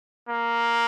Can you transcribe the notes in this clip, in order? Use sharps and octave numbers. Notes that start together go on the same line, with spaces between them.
A#3